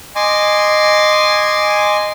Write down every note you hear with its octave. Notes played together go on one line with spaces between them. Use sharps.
D#5 G#5 C6 D6